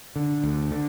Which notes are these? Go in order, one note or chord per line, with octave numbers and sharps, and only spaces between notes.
D3
D2
D3